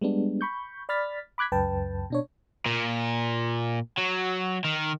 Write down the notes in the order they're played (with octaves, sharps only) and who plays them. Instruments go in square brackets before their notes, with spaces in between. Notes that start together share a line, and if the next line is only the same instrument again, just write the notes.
[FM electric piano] G3 G#3 B3 D4
B5 C#6 G6
D5 B5 F6 A6 B6
B5 D6 F#6 G#6 B6
C#2 F#2 B4 G5 A5
B2 D4 C#5
[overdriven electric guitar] A#2
F#3
D#3